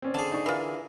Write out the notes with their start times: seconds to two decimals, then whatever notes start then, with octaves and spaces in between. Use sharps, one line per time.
0.02 C4 C#4 D5
0.14 D3 G#4 A5
0.31 D#4 D5 C#6
0.46 E3 F4 A#4